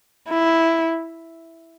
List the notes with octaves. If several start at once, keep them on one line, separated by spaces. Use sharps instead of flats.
E4